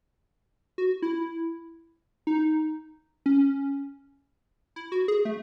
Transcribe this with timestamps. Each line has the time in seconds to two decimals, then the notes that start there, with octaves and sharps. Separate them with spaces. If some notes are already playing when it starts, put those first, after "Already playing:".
0.78 F#4
1.02 E4
2.27 D#4
3.26 C#4
4.76 E4
4.92 F#4
5.08 G#4
5.25 A3